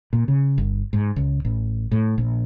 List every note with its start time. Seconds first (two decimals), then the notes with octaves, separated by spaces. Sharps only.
0.13 A#2
0.28 C#3
0.58 G1
0.93 G#2
1.16 C#2
1.45 A1
1.91 A2
2.18 A#1